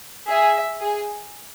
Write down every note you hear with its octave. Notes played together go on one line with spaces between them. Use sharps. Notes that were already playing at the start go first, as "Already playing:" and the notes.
G#4 E5
G#4